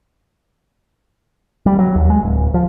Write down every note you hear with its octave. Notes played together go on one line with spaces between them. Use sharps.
G3
F#3
D#2
G#3
D1
F3